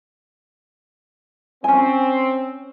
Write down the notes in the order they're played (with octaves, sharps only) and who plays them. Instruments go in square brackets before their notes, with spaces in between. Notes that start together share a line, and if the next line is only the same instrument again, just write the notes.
[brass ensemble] C4 [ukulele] C#4 G#5